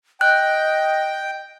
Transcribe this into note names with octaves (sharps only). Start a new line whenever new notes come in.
D#5 G5 F#6